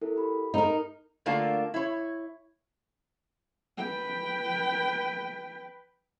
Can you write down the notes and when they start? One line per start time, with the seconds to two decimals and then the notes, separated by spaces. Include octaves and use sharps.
0.01 E4 A4 A#4
0.16 G4 B5
0.54 D#4 A#4
1.26 D3 A3 A#3 D4 F4
1.74 E4 C#5
3.78 B4 G5